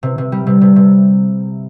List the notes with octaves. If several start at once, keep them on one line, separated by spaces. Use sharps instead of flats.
C3
C3
G3
C3
C3
C3